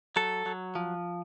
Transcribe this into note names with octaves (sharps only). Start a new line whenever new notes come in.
F#3 A4
F#3
F3